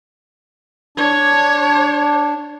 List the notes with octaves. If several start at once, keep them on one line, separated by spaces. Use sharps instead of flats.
D4 C#5